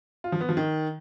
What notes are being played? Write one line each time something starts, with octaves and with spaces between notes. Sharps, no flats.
F4
F3
B3
F3
D#3